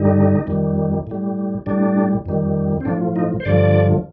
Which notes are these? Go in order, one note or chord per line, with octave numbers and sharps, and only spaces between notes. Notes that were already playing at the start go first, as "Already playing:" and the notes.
Already playing: G2 D3 G3 D#4
F2 D#3 G3
A2 G3
A2 G3 D4
F2 D#3 G3
C4
A2 F3 D4
D#4
C5
G2 D3 F3 D5